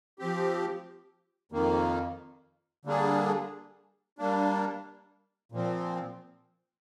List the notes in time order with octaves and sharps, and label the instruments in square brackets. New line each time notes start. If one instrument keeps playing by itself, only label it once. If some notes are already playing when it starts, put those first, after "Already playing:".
[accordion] F3 C4 G4
F2 D#3 A#3
D3 G3 A#3 D4 G#4
G3 A#3 D4
A#2 F3 C4